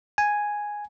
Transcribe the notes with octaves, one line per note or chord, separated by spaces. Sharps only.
G#5